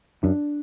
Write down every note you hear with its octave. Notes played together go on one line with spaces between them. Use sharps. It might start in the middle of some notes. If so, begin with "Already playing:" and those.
F#2 D4